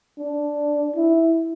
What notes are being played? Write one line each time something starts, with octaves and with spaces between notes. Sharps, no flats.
D4
E4